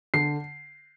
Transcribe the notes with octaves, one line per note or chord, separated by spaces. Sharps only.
D3 C7